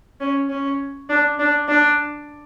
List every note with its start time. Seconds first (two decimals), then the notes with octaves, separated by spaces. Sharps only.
0.21 C#4
0.50 C#4
1.09 D4
1.39 D4
1.68 D4